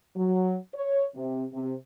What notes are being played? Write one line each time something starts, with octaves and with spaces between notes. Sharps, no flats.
F#3
C#5
C3
C3